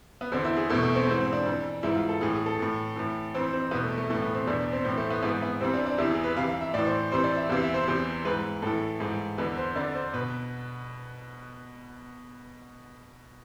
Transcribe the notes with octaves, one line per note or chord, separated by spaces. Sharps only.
B3
E2 D3 C4
E4
G#4
E2 B2 A3
A3
C4
G#2 E3 C4
C4
D4
F2 E3
G#2 E3 E4
F4
A4
A2 E3 G#4
G#4
A4
A2 E3
A2 E3
F2 E3 C4
C4
E2 B2 B3
A3
A3
A2 E3 A3
B3
C4
E2 B2 D4
C4
A2 E3 C4
A3
B3
G#2 E3 B3
B3
F2 C3 E3 C4
D4
D4
E2 C3 E3 E4
G#4
B4
F2 C3 E3 F5
F5
E5
A2 E3 D5
C5
F2 C3 E3 C5
D5
E5
E2 C3 E3 F5
E5
C5
E2 C3 E3
G#2 E3 B4
A2 E3 A4
G#2 E3
E2 D3 B4
C5
F2 D3 D5
C5
B2 B4